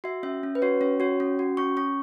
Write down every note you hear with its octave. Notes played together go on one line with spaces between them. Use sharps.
F#4 E5
C#4 E5
C#4
B4
F#4 C#5
C#4 C#5
F#4 C#5
C#4
F#4
C#4 C#6
C#4 C#6